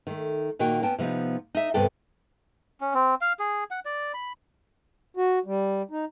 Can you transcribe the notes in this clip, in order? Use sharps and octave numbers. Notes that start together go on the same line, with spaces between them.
D#3 A3
A#2 D#3 A#3 F#4 G5
B3 C#4 G5 A5
C3 F3 B3 D#4
D#4 E5
D2 G2 C3 B3 A4 G5
C#4
C4
F5
G#4
F#5
D5
B5
F#4
G3
D#4